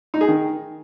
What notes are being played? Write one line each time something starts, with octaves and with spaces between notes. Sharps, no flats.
D#4
G#4
D#3